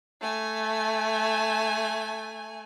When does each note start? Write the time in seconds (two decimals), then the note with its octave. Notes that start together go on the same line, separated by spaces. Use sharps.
0.21 A3 G#5